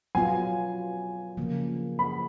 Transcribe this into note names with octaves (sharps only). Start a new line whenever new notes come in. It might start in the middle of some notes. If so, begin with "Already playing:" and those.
F#3 B3 F4 G#5
C#3 F3 A#3
B5